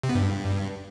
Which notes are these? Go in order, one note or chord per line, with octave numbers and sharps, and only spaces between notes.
C3
B3
G2